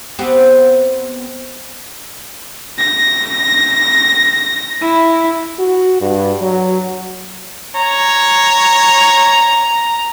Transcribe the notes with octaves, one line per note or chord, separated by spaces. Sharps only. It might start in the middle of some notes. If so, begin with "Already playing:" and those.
B3 C4 G4
A#6
E4
F#4
G2
F#3
C#5 A#5